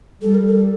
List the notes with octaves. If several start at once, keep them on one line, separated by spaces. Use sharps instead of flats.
G3 A4
A#4
A4